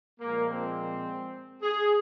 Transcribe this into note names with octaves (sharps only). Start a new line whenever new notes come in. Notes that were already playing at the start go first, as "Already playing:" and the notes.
A#2 F3 G#3 A#3
C4
G#4